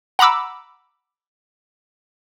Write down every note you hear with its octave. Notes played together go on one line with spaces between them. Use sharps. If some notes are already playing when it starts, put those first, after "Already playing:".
F#5 A#5 B5 D6 E6